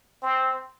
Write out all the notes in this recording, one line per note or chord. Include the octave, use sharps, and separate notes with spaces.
C4